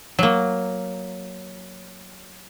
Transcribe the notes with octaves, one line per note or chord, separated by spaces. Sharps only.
F#3 A#3